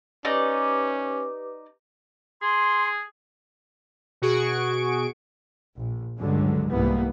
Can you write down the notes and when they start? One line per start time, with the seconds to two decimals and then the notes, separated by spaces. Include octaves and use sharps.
0.25 C#4 D#4 G4 B4 D5 D6
2.42 G#4 C6
4.22 B2 F#4 G#4 C#6 D7
5.76 A#1
6.18 C#2 G2 D3 F#3 G#3
6.71 C2 G#2 E3 G3 A#3 B3